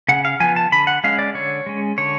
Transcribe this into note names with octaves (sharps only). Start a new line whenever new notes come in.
C#3 F#5
F5
F3 B3 G#5
A5
D3 B5
F#5
G#3 C#4 F5
D5
D3 C#5
G#3 C#4
D3 C#5